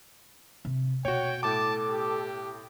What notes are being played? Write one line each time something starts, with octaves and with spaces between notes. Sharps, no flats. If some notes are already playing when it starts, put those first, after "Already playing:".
C3
B2 F#4 C#5 G5
A2 A4 A5 D6
G4